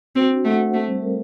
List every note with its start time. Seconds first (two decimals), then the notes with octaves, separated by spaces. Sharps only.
0.15 C4 F#4
0.30 D4
0.45 A3 F#5
0.59 C5
0.74 A3 C4
0.88 G3
1.02 A#4